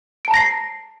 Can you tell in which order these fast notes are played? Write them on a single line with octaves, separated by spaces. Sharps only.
D7 A5 A#5 A#6 C7